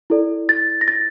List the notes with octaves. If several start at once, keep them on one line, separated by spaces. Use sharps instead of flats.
E4 A4 D5
A6
A#6
A6